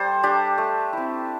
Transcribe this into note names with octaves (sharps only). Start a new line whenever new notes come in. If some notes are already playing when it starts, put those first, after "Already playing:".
Already playing: G3 A4 C5
D4 G4
A3
C4 E4